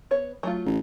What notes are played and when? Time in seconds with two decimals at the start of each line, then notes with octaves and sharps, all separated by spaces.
0.11 B3 C#5
0.43 F#3 A3 F4
0.66 A1